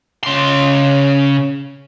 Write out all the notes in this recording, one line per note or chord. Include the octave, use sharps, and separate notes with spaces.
C#3 C6